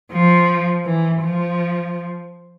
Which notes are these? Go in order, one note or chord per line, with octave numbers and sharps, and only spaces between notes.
F3
E3
F3